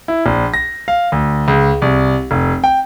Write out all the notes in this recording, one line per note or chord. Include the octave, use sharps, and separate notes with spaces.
E4
A#1
A#6
F5
D2
C#2
C2
F1
G5